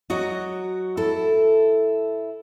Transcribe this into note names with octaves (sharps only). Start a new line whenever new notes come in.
F#3 F#4 D#5
E4 A4